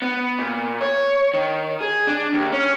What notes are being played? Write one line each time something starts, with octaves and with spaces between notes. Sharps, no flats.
B3
A#2
C#5
D#3
G#4
D4
D#2
C#4